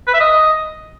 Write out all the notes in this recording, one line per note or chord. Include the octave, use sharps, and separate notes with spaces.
B4
E5
D#5